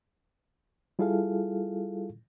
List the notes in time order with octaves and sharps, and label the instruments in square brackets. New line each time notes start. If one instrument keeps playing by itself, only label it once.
[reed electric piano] G3 E4 F4 G#4 A4 F5